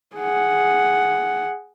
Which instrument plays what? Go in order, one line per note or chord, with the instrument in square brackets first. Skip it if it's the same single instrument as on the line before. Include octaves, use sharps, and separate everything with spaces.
[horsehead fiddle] G#4 F#5